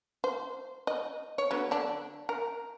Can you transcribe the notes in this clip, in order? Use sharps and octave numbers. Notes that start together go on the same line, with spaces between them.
C5
D#5
C#5
D3 F#3 B3
D3 D4
A#4